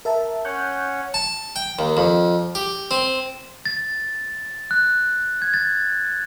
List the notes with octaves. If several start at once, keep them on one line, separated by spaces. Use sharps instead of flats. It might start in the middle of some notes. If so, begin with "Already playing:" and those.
A#4 E5 A5
C#4 C#5 F#5 C#6 F#6 G6
A5
G5
D#2
F2
G4
C4
A6
F#6
G#6
A6